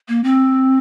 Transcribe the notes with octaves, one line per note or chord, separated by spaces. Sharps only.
A#3
C4